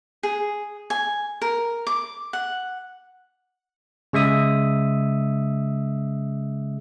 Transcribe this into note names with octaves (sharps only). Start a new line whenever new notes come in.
G#4
G#5
A#4
D6
F#5
C#3 G#3 E5 D#6